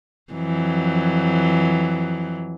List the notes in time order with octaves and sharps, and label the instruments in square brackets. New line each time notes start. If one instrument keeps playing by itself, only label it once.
[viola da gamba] F2 E3 F#3